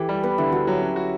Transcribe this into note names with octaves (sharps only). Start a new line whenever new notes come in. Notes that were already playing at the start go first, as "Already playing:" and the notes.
Already playing: E3 G4 A4
G3
B3 B4
D3 E4
D3 F#4
F#3 G4
C#4
F#4